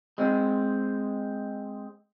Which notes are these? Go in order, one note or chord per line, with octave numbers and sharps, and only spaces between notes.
G#3 C4